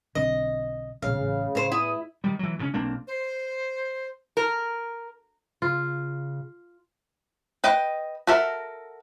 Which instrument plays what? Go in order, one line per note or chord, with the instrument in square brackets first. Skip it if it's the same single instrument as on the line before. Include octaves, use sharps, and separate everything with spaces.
[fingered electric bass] B1 D3 C4 [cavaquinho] D#5
[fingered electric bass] E1 A#1 E2 [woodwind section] C#3 [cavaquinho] F5
[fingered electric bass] A1
[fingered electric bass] A2 [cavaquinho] C5 C#5
[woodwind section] E2 D#6 [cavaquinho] E4
[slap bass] D#3 G3
E3 F#3
G2 C#3 C#4
B1 A#3 C4 D4
[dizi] C5
[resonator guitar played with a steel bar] A#4
[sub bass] C#3 [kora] F4
[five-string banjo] B4 D#5 G5
F#4 A4 A#4 E5